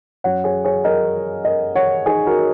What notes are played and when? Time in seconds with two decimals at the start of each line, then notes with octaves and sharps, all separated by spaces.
0.24 F#2 F#3 C#5 F#5
0.44 G#4 C#5
0.65 G#4 C#5
0.84 A#4 D#5
1.45 A#4 D#5
1.75 C#5 F#5
2.06 D#4 G#4
2.26 F#4 A#4